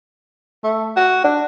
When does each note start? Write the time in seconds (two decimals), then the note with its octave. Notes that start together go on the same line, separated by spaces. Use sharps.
0.64 A3
0.96 F#4
1.24 D4